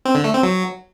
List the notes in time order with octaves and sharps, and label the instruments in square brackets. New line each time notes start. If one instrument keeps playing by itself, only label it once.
[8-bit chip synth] C4
D3
A3
C4
F#3